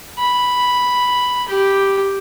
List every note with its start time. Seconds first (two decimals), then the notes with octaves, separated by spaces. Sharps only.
0.19 B5
1.49 G4